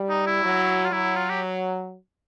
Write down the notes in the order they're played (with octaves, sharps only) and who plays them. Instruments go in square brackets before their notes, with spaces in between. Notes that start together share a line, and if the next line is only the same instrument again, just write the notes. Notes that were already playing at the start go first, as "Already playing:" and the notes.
Already playing: [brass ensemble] G3
[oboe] D#4
E4
[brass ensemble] F#3
[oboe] F4
[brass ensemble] F#3 [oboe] E4
[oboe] F4
G4